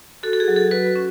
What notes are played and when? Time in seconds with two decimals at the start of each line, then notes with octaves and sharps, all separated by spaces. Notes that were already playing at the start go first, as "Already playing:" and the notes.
0.23 F#4 A4
0.33 A4
0.40 G#4
0.48 F#3
0.56 A4
0.71 F#4 B4
0.96 C#4